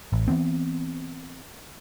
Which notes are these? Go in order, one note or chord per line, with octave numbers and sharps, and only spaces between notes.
A1
E3 F3 B3 C4